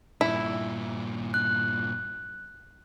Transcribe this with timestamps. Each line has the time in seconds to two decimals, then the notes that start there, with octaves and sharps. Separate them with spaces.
0.21 G2 A#2 E4
1.34 F#6